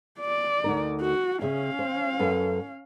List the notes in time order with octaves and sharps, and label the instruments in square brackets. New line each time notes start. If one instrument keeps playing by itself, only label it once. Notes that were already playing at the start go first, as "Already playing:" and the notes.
[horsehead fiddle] D5
[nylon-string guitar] D2 D#4 A#4
[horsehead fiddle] F#4
[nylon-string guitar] C#3 G#4 E5 [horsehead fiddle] C#4 F5
[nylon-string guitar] C5
F#2 A4 B4